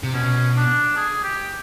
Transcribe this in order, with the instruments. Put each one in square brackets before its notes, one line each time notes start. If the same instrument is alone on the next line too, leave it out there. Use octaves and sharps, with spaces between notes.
[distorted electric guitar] C3
[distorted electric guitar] B2 [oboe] C#4
[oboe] D4
G#4
G4